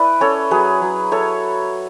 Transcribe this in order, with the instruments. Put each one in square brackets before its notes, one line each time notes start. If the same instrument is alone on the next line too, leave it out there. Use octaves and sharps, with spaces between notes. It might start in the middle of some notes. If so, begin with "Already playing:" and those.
Already playing: [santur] E4 B4 D5
C#4 A4 C#5
F#3 G#4 B4
F#3
E4 A4 C#5